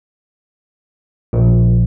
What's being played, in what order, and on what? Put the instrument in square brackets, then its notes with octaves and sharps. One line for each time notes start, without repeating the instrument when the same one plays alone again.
[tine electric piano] A#1